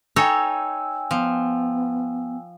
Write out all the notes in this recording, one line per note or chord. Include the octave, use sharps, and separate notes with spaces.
D#4 A4 C#5 G5 G#5 E6
F3 B3